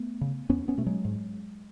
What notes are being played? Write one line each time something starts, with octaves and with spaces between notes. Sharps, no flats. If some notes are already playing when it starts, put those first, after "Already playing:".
Already playing: A3 B3
C#3
E2 B3 C#4
B3 C#4
B2 A3
F#3 G#3
G#2